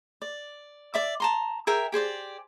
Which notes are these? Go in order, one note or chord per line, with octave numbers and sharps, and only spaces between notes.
D5
D5 E5 D6
A5 A#5 C6
G#4 A#4 E5 G5
G4 G#4 C5 D5